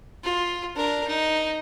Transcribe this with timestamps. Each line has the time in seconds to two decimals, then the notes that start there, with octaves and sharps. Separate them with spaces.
0.23 F4
0.76 D4 A#4
1.08 D#4